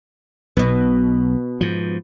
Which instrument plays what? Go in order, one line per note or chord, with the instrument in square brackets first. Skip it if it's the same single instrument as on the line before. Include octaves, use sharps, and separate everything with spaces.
[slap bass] B1 [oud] B2 B3
[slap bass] G#2 F3